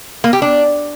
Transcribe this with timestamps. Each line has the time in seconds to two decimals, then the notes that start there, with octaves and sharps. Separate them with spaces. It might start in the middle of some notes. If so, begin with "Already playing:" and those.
0.24 A#3
0.33 G4
0.42 D4